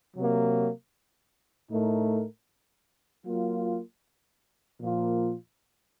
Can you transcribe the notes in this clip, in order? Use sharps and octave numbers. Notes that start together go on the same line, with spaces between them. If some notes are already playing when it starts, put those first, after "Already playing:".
C3 F#3 A#3
A2 A3 D#4 A#4
F#3 A#3 F4
A#2 F3 A#3 F4